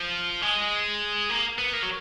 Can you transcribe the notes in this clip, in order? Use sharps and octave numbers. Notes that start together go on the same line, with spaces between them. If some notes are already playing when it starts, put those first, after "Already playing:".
Already playing: F3
G#3
A#3
B3
A#3
F#3